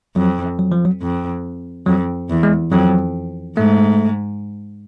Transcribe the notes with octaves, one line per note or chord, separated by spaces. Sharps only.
F2 F#3
F#3
F3
F#3
F2
F2 F#3
E2
G#3
F2 F#3
G#2 A3